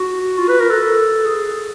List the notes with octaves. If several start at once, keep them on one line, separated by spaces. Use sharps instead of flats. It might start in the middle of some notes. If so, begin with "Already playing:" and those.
Already playing: F#4
F4
B4
A#4
A4
G#4